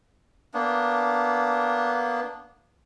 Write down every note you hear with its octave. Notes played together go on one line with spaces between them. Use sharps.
A#3 B3 D4